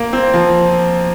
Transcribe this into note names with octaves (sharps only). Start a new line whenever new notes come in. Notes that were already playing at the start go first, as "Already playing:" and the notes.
Already playing: A#3
C4
F3